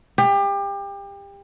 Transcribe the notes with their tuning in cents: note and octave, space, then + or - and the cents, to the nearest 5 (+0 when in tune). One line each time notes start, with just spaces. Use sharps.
G4 +30